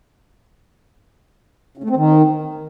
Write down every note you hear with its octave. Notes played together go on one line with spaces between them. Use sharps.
C#3
A3
C4
D#3